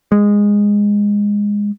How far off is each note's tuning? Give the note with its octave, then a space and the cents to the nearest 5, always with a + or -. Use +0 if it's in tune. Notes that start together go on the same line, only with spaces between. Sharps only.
G#3 -15